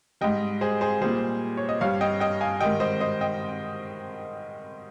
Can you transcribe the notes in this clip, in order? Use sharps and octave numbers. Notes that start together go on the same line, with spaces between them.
G#2 G3 D#5 G5
G#4 C5
G#4 C5
A#2 G3 G#4 C5
C#5
D#5
G2 G3 C#5 F5
D#5 G5
D#5 G5
F5 G#5
G#2 D#3 G3 D#5 G5
C5 D#5
C5 D#5
D#5 G5